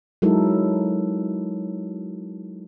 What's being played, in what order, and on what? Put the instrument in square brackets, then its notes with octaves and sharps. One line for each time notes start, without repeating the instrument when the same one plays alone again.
[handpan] F#3 G#3 D#4 E4 A4 A#4